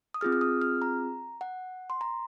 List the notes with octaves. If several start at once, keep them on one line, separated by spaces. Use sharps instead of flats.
D#6
C4 F4 G#4 F6
F6
D#6
F6
A#5
F#5
C6
A#5